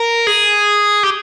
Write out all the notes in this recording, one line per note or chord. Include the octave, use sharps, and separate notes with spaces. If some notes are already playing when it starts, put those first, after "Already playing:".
Already playing: A#4
G#4
G4